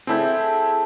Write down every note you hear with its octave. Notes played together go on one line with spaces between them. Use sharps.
C4 E4 G#4 A4 E5 G6